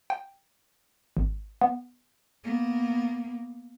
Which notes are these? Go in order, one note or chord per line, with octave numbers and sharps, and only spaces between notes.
G5
G#1
B3
A#3 B3